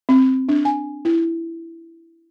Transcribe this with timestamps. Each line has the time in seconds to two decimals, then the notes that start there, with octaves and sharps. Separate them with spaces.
0.09 C4
0.49 D4
0.65 G#5
1.05 E4